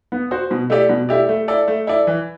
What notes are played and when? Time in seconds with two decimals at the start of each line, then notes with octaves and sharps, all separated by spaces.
0.12 B3
0.31 F#4 C5
0.51 B2
0.70 A3 E4 G4 D5
0.89 B2
1.09 A3 E4 G4 D5
1.29 A3
1.48 E4 A4 D5
1.68 A3
1.87 E4 A4 D5
2.07 E3